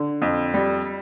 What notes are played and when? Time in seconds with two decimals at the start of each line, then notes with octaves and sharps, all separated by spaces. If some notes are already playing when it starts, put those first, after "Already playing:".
Already playing: D3
0.22 F2
0.54 G3